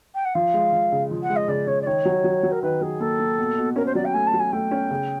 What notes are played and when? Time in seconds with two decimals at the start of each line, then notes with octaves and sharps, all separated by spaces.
0.15 G5
0.25 F#5
0.34 F3 F5
0.54 G#3
0.73 F3
0.92 C#3
1.11 F3
1.23 F#5
1.30 G#3
1.36 D#5
1.48 C#3 D5
1.67 C#3 C#5
1.81 D5
1.86 D#3 C#5
2.05 F#3
2.24 F#3
2.43 F#3
2.52 A#4
2.62 D#3 B4
2.81 F#3 G#4
3.00 A#3 A4
3.20 A#3
3.38 B2
3.58 B2
3.76 C#4 A#4
3.86 C5
3.95 F#3 D5
4.05 G5
4.14 A3 G#5
4.27 A5
4.33 F#3
4.39 G#5
4.52 A3 G5
4.71 C#4
4.91 C#3